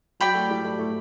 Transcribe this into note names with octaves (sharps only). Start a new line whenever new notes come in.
F#3 D5 G5 B5
A3
G3
A3
A3